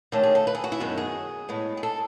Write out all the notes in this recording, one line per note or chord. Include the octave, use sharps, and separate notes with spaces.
D#2 D#3 A3 C#4 A4
G#4
A4
B4
G#4
F#4
E4
F#2 D#3 G#3 B3 F#4
G#4
A2 G#3 B3
G#4
A4